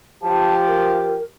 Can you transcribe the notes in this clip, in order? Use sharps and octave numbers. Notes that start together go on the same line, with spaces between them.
F3 G4 A5
A#4